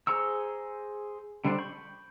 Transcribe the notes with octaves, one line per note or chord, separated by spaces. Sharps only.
G#4 C5 A#5 C#6 E6
D3 G3 D4 C5 D5
B5 C#6 G6